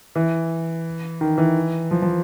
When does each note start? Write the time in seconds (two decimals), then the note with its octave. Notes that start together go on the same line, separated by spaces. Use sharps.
0.16 E3
1.21 D#3
1.38 E3
1.91 F3
2.02 F3